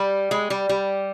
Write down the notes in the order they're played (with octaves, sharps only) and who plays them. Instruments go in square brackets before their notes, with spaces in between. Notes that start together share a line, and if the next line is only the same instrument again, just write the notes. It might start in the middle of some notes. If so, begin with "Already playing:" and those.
Already playing: [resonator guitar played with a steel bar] G3
G#3
G3
G3